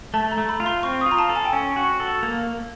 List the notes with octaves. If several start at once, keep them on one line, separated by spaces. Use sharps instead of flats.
A3 A5
A#5
A3
B5
F4
C6
C4 C#6
D#6
F4
A#5
A5
A4
G#5
G5
C#4 G#5
F#4
A4
A#3